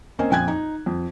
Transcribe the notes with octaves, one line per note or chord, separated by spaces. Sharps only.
A#3 C4 C#4 C5 D#5 G#5
A#1 F2 G5 G#5 F#6 G#6
D#4
F2